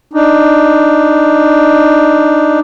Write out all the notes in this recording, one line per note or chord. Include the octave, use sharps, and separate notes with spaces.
D4 D#4